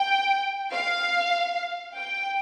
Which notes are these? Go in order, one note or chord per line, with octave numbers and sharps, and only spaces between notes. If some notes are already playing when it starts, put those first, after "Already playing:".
Already playing: G5
F5
G5